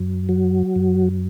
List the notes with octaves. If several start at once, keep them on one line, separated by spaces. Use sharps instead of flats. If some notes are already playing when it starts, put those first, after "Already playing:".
Already playing: F#2
F#3
F#2